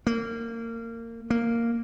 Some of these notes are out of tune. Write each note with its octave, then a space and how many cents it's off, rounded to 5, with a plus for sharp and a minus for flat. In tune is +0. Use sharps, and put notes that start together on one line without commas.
A#3 -25
A#3 -5